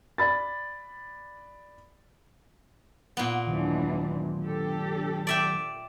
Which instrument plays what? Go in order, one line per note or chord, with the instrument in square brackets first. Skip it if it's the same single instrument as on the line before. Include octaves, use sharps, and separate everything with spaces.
[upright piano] D5 B5 A6
[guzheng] A#2 B3
[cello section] D#2 E3 D4 [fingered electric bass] D#3 F#3
[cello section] D4 G4 A4
[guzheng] D5 E5 G5